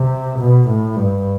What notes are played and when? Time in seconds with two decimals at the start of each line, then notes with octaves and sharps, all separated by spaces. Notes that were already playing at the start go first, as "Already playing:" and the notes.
Already playing: C3
0.39 B2
0.68 A2
0.96 G2